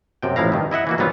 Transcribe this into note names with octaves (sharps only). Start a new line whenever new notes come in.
F#2 C3 G5
A1 F3 E4 F5 A#5
G2 D#3
E4 D#5 E5 F#5
E3 A#3 F#4
G#2 F#3 G3 B3 F4